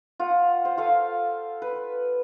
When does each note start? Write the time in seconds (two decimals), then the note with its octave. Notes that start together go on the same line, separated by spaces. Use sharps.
0.20 F4 F#5
0.65 C5
0.77 F4 A4 F5
1.62 B4